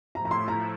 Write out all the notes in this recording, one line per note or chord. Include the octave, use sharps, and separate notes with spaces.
A2 F3 A3 E4 A#5
A#5
C6
A#5